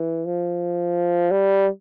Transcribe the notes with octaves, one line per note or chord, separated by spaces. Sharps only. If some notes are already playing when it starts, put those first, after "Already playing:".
Already playing: E3
F3
G3